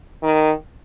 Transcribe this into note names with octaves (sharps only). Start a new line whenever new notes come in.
D#3